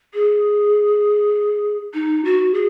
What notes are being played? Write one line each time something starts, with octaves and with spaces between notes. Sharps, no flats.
G#4
D#4
F#4
G#4